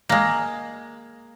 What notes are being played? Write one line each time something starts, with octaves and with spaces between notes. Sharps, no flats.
G#3 A#3